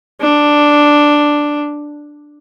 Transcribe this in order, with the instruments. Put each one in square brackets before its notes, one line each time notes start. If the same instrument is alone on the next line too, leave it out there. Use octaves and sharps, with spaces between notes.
[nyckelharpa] D4